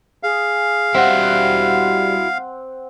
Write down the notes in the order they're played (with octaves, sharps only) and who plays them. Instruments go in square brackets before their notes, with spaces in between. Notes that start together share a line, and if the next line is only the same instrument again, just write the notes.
[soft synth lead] G#4 [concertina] F5
[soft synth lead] G3 [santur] C4 F#5 [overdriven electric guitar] E4 F#4